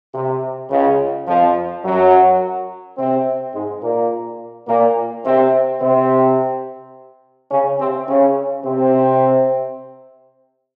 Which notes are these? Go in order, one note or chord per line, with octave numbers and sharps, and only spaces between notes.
C3
C#2 C#3
F2 F3
F#2 F#3
C3 C4
G#2 G#3
A#2 A#3
A#2 A#3
C3 C4
C3 C4
C#3 C#4
C3 C4
C#3 C#4
C3 C4